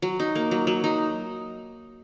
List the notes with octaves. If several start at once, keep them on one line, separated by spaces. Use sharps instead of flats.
F#3
D#4
A#3
F#3
F#3
D#4